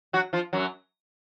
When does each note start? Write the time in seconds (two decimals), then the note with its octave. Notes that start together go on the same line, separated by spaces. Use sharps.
0.13 F#3 F#4
0.33 F3 F4
0.53 F#2 F#3